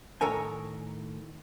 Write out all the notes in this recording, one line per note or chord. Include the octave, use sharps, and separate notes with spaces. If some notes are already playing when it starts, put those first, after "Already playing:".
A2 D#3 A4 A#4 C#5 G#5